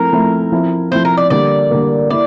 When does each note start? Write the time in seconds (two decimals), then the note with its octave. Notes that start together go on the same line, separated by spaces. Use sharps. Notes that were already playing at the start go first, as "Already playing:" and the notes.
Already playing: F3 A3 C4 E4 A#4
0.12 F3 A3 C4 E4
0.52 F3 C4 E4
0.91 F3 C4 E4 C5
1.05 A#4
1.17 D5
1.30 D3 G3 A#3 D5
1.71 D3 G3 A#3
2.10 A#3 E4 D5